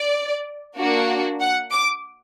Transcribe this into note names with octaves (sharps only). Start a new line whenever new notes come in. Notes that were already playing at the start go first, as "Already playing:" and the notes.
Already playing: D5
A#3 D4 F#4
F#5
D6